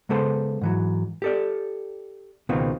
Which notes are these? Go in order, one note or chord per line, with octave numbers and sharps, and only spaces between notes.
C#3 G#3 B3 A4 C5 C6
G#2 E3 F#3
G4 A4 D5
C#2 B2 D#3 B3 C4 F4